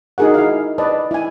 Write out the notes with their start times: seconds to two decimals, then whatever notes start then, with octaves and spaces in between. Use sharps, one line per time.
0.18 D#4 F#4 G#4 A#4 F#5
0.34 E4 F5
0.78 B4 D5 D#5 A5
1.11 E4 G#5